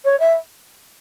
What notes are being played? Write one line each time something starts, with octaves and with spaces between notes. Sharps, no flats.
C#5
E5